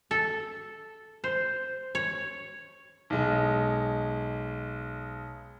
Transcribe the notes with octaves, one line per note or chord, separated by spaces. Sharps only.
A4
C5
C#5
B1 G#3